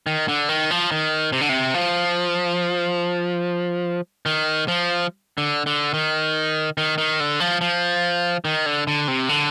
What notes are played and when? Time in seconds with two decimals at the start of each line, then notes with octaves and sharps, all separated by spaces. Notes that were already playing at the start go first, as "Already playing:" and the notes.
0.07 D#3
0.28 D3
0.49 D#3
0.71 F3
0.92 D#3
1.32 C3
1.41 D3
1.49 C3
1.74 F3
4.26 D#3
4.68 F3
5.38 D3
5.66 D3
5.94 D#3
6.78 D#3
6.98 D#3
7.20 D3
7.40 F3
7.61 F3
8.45 D#3
8.66 D3
8.87 D3
9.08 C3
9.29 D3